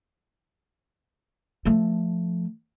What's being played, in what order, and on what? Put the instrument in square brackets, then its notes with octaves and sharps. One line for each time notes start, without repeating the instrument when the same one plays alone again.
[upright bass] F3 A3